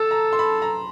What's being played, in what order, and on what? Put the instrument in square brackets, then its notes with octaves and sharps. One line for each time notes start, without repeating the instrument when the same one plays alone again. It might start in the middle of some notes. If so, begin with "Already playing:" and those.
Already playing: [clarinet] A4 [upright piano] A5
[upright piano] A#5
C6
B5
A#5